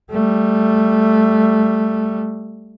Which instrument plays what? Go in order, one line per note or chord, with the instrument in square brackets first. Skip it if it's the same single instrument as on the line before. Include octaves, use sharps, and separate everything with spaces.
[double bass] G3 A3